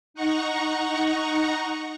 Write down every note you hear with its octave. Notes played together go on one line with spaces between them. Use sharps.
D#4 F#5 A#5 C#6